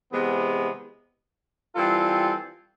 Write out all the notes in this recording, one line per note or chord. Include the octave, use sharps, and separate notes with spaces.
C3 E3 G#3 B3
E3 G3 C4 F4 A4